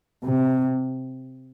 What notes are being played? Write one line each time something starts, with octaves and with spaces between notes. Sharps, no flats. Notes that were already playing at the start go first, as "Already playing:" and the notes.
C3